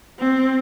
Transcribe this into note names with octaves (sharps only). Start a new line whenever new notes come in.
C4